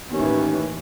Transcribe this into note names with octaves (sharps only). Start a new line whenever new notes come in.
A1 D#2 E3 C#4